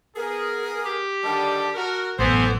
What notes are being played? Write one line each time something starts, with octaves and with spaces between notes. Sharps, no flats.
B3 G#4 A#4
G4
D3 D#3 G3 A5
F#4 A#4
A1 F#2 E3 B3 A4 C5